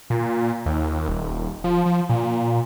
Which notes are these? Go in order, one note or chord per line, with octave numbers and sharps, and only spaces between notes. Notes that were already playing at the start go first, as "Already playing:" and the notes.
A#2
D#2
D#1
F3
F3
A#2